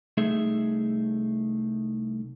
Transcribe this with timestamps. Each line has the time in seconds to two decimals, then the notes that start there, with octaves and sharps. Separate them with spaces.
0.17 C2 A3 D#4 G#4 E5